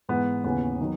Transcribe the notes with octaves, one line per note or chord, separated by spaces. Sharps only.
G#2 E3 B3
D#2 C#3 E3 B3
D#3 F#3